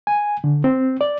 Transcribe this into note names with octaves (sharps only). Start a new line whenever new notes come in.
G#5
D3
C4
D5